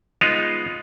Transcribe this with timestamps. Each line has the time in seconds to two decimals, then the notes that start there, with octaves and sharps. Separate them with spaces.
0.21 G#3 B3 D#4 F4